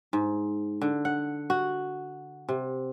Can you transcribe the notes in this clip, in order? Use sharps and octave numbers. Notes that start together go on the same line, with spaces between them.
G#2
D3
F#5
F#4
C3